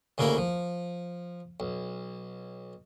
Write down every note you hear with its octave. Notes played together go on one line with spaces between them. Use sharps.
D2 C#3 A#3 E4 A#4 A#5
F3
B1